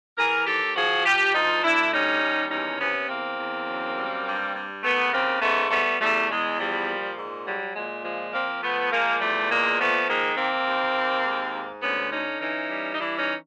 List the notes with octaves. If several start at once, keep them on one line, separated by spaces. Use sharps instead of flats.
E3 G#4 A#4
D#2 G4 A4
F3 F#4 G#4
F3 F4 G4
D2 D#4 F4
D2 D4 E4
G3 C#4 D#4
D#2
E2 C#4 D#4
C3 B3 C#4
E2 A#3 C4
E2
F#2
G3
G2
G2
D#2 A3 B3
C#3 A#3 C4
G#2 A3 B3
G3 A3 B3
E2 G3 A3
E2 G#3
F3 G3
A#2
G#2
F#3 G3
A#2 G#3
F3 G#3
F3 A#3 C4
F3 A3 B3
F3 G#3 A#3
E2 G3 A3
A#2 G#3 A#3
F3 A3 B3
D#3 G#3 A#3
C3 A#3 C4
D#2
D#2
G#2
G#2
D2 B3 C#4
D3 C#4 D#4
E3 C#4 D#4
G3
D#4
E3 D4 E4
C#4 D#4